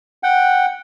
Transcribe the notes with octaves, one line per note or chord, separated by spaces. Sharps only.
F#5 G5